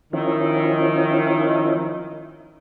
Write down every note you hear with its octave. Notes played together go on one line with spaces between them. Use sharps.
D#3 F3 C#4 E4